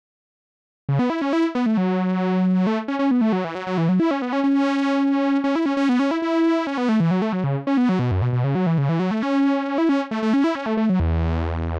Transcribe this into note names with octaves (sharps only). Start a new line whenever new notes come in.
C#3
B3
E4
C#4
E4
B3
A3
F#3
A3
C#4
C#4
B3
A3
F#3
E3
F#3
F#3
E3
F#3
E4
C#4
B3
C#4
C#4
C#4
E4
C#4
C#4
B3
C#4
E4
E4
C#4
B3
A3
E3
F#3
A3
F#3
C#3
C#4
B3
F#3
B2
F#2
B2
B2
C#3
F#3
E3
C#3
E3
F#3
A3
C#4
E4
C#4
A3
A3
C#4
E4
C#4
A3
A3
F#3
E2